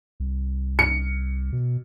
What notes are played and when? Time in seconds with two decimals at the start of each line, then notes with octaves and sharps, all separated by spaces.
0.20 C2
0.79 C#7
1.52 B2